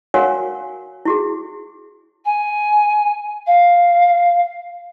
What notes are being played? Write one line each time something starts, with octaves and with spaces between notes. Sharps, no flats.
F#4 A#4 C#5 F5 F#5 G#5
E4 F#4 G#4
G#5
F5